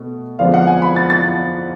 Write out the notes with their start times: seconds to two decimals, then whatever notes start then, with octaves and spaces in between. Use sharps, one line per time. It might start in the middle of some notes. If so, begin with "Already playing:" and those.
Already playing: B2 A3
0.39 F2 D3 F3 G#3 B3 F5
0.54 F#5
0.67 G#5
0.82 B5
0.96 A6
1.10 A6